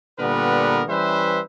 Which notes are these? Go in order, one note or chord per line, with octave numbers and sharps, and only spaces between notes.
A#2 D3 G3 B3 A#4 B4
E3 G3 C#4 B4 C5 E5